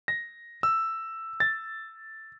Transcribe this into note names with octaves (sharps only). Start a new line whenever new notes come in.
A#6
E6
A6